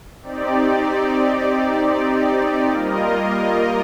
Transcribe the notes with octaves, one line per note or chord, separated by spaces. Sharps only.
C4 D#4 G4 D5
G3 A#3 F4 A#4 D#5